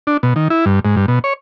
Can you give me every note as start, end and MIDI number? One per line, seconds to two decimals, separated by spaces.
0.07 0.17 62
0.23 0.34 47
0.36 0.48 51
0.50 0.65 64
0.66 0.80 43
0.85 0.96 44
0.96 1.06 43
1.08 1.19 47
1.24 1.33 73